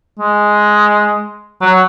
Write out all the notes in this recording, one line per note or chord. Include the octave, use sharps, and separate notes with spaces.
G#3
F#3